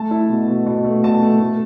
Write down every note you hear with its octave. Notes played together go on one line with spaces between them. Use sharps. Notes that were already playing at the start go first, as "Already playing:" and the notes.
Already playing: A3 A5
E4
B2
B2
B2
A3
B2 A5
A3
A3